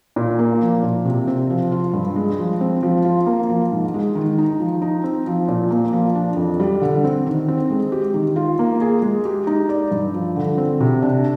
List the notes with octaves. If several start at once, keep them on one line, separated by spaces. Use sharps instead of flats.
A#2
A#3
F3
A#2
C3
C4
F3
F4
G2
G#3
F3
C4
F3
F4
A#3
F3
G#2
G#3
D#3
D#4
F3
D#4
C4
F3
A#2
A#3
F3
D4
F2
G3
D3
C4
D#3
C4
G#3
G4
D#3
F4
A#3
G#4
G#3
G4
D#4
D5
G2
F3
D3
C4
C3
D4